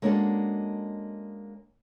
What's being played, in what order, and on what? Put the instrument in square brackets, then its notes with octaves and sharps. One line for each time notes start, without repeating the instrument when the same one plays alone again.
[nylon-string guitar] G#3 A#3 C#4 D4 F#4 A4